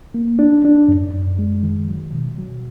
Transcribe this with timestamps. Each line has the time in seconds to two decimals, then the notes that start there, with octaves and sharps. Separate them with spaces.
0.14 A#3
0.39 D4
0.65 D4
0.88 F#2
1.13 F#2
1.39 G#3
1.63 D#3
1.88 F#3
2.12 B2
2.38 F#3